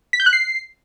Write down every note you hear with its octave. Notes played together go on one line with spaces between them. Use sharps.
B6
G6
F#6
C7